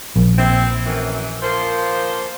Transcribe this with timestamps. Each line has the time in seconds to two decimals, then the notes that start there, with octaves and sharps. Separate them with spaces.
0.16 A#1
0.38 C4 E4
0.86 F#2 E3
1.42 F3 A#3 C5